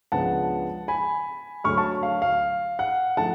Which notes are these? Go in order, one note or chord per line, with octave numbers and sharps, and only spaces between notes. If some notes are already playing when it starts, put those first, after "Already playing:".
C#2 C#3 F3 B3 D4 F#5 A5
G#5 B5
D2 D3 F#3 C#6 F6
A5 C#6
F5
F5
F#5
D3 F3 A3 F#5 A5